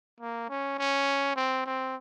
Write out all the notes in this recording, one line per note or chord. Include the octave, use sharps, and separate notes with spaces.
A#3
C#4
C#4
C4
C4